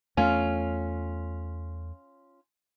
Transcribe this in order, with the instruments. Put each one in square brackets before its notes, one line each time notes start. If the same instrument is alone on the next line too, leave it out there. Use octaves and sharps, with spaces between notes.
[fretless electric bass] E2 A3 [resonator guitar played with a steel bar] C#4 F4